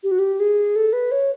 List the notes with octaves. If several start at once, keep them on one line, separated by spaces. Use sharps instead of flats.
G4
F#4
G4
G#4
A4
B4
C#5